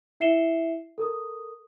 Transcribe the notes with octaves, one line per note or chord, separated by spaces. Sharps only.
E4 E5 C7 C#7 E7 G7
A4 A#4 D#6